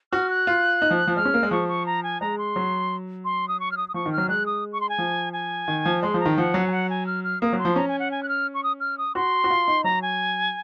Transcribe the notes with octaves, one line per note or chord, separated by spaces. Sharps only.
F#4 F6
F#6
F4
D#4
F3
F3
G#3 F6
C#4
A#3
G#3
F3 C#6
C#6
A#5
G#5
G#3 A#5
C6
F#3
C6
D#6
C#6
F6
D#6
D#6
F3 C#6
D#3
F6
F#3
G#3 F#6
D#6
C#6
C6
G#5
F3
G#5
D#3
F3
G#3 C6
F3
A#5
D#3
F3 F#5
F#3
G#5
F#5
G#5
F6
F6
A#3 D#6
F#3
C6
F3
C#4 A#5
G#5
F#5
G#5
F#6
F6
C#6
D#6
F6
D#6
F#4 C6
F#4
F4
D#4
F#3 A#5
G#5